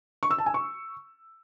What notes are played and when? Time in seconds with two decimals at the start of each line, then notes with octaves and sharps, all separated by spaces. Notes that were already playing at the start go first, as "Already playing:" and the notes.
0.23 C#6
0.31 E6
0.38 A5
0.46 G#5
0.54 C#6